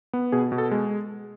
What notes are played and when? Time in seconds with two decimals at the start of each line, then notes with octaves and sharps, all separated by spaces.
0.13 B3
0.32 B2 G#4
0.52 B2
0.58 A4
0.71 G#3